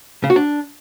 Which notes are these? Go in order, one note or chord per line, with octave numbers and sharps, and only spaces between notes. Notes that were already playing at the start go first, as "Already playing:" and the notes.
C#3
F#4
D4